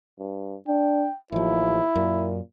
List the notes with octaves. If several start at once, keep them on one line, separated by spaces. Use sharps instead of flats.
G2
D4 G5
A1 D#2 F3 E4
F#2 A#2